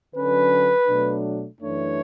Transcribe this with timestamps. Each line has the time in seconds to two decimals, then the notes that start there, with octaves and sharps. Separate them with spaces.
0.14 D3 F#3 C#4 B4
0.88 B2 F#3 A3 D4
1.61 F#2 E3 A3 D4 C#5